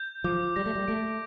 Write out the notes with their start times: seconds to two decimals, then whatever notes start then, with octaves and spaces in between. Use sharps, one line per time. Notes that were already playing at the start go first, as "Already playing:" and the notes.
Already playing: G6
0.24 F3 D6
0.56 G3 A#6
0.66 A3
0.75 G3
0.88 A3 D7